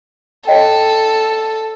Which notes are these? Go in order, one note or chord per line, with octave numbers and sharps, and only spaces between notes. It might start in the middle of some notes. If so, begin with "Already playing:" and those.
A4 C#5 D#5 G5